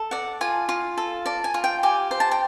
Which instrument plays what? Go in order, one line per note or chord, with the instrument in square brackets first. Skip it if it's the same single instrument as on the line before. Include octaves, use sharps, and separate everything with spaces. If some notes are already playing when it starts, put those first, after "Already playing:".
Already playing: [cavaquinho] A4
D5 F#5
F4 G#5
F4
A4
D5 A5
G#5
F4
G5
G4 G#5
C5
A5
G5